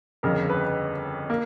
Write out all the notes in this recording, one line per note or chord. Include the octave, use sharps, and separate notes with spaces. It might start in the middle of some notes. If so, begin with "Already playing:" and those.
G1 F2 C#3 A#4
B4
A#3